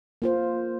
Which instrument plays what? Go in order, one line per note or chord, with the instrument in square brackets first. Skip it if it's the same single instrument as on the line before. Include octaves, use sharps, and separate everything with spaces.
[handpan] A#3 F4 C5